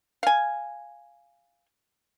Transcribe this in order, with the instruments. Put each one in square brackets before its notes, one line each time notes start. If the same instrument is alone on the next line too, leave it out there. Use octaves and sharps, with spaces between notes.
[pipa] F5 G#5